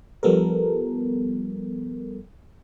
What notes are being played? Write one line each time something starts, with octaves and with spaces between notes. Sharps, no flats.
F3 G3 B3 A4 A#4